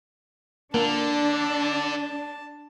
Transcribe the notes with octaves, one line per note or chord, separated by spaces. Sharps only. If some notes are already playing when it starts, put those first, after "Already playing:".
D3 A#3 D4 A5